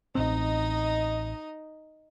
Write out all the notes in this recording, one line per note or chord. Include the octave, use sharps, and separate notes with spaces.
A1 C4 D#4 D#5